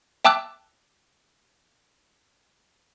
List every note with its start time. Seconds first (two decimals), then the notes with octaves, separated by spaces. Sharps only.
0.25 E5 G5 A5 D6 E6 F#6